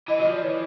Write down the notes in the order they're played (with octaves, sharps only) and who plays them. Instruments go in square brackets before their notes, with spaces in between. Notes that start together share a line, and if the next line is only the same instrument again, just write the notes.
[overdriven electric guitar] E3 [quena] D#5
[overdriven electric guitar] F#3 [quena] D#5
[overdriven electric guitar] F3
[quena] D5
[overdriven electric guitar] E3 [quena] C#5